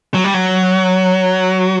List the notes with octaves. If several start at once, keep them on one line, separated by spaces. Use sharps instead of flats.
F#3
G3
F#3